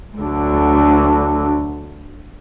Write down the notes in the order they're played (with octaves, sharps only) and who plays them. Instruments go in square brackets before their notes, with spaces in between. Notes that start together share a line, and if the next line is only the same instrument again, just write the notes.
[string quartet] D2 D3 F#3